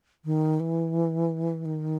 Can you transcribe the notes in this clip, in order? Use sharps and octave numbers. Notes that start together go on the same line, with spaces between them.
D#3
E3
D#3